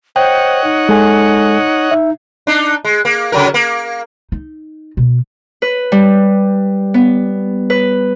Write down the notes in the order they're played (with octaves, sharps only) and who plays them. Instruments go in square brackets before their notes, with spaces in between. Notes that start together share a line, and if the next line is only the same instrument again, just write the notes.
[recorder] C5 [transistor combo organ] C#5 D#5 F#5 [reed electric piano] G5
[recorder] D#4
[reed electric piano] G#3 A4 G#5
[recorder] D#4 [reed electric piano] E5
[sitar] D4 D#4
G#3
A#3
C#3 F#3 A#4
A#3
[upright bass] D#4
B2
[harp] B4
G3
B3
B4